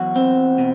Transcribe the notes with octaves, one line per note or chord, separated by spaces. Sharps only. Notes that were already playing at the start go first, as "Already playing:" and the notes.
Already playing: E2 F#3 F#4
C4
B2